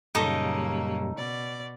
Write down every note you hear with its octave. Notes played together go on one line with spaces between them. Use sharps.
F#2 A#2 C#3 G3 A#3 D#4 A4 D#5
B2 D5